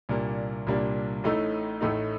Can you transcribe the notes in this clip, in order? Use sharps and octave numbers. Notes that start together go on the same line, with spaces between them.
C2 A#2 G3 A#3 D4
C2 A#2 G3 A#3 D4
A1 A2 A3 D#4
A1 A2 A3 D#4